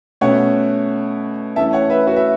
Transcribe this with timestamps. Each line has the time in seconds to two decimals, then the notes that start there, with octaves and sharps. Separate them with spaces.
0.21 B2 A3 C#4 C#5 F#5
1.56 E3 A3 C#4 E5 A5
1.73 C#5 F#5
1.90 B4 E5
2.07 F#4 B4
2.16 E5